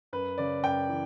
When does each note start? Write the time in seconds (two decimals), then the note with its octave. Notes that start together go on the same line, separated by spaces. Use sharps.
0.13 F#2 B4
0.38 C#3 D5
0.64 F#2 G5
0.89 E3